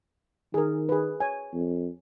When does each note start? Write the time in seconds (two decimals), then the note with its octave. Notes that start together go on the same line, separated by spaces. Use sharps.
0.54 D#3 G#4 A#4
0.89 G#4 B4
1.20 C#5 G#5
1.53 F2